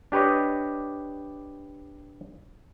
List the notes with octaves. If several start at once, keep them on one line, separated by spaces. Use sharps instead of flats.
D4 G4 B4 C#5 D#5